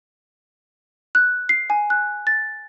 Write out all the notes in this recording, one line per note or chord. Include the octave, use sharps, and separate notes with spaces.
F#6
C7
G#5
F#6
A6